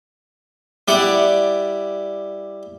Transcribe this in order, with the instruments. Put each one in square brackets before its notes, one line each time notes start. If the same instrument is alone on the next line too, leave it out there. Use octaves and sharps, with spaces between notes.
[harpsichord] G3 E4 D5 F#5